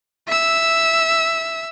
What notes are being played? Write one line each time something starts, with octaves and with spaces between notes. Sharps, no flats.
E5 E6